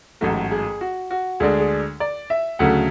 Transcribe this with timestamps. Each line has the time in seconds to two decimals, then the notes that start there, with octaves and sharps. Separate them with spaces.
0.21 A1 G#2 F#3 A3 F#4
0.51 G#4
0.81 F#4
1.10 F#4
1.40 D2 D3 G#3 D4 G#4
1.60 G#4
2.00 D5
2.30 E5
2.59 D2 C#3 F#3 A3 F#5